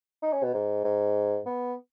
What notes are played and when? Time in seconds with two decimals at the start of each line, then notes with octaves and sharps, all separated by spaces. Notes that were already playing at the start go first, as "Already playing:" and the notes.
0.23 D#4
0.33 C#4
0.43 B2
0.54 G#2
0.84 G#2
1.46 B3